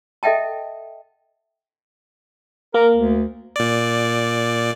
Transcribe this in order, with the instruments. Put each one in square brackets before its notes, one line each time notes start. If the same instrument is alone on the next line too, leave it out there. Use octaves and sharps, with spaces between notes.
[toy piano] A4 D#5 E5 F#5 G5 A5
[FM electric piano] A#3 [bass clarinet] A#4
[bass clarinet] D2
[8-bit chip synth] A#2 D5